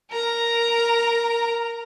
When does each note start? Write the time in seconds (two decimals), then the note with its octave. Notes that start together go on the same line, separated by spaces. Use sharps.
0.11 A#4 A#5